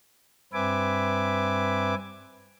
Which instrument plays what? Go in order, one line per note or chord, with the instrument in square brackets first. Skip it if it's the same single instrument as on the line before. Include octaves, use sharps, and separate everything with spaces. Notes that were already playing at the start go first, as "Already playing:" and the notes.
[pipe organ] G2 C4 B4 E5 G#5 D6